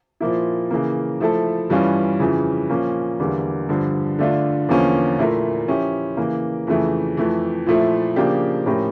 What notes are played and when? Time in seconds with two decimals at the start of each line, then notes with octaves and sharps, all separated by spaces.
0.20 A#2 F3 A#3 E4
0.71 C#3 E3 A#3
1.21 F3 A3 E4 A4
1.70 G2 E3 G3 C#4 F4
2.19 F2 C#3 E3
2.69 A#2 F3 A#3 C#4
3.19 E2 D3 G3 A#3
3.69 G2 D3 F3
4.19 D3 A3 D4 F4
4.68 E2 D3 F3 A#3 C#4
5.18 A#2 A3 E4 A#4
5.68 F3 C#4 E4 G4
6.17 C#3 E3 A#3
6.67 F2 C#3 E3 A3
7.17 F2 E3 A3
7.66 A#2 F3 A3 E4
8.16 C#3 F3 A#3 D4 G4
8.66 A2 F3 C#4 G4 A#4